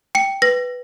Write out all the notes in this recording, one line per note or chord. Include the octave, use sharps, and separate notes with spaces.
G5 C#7
B4 A#6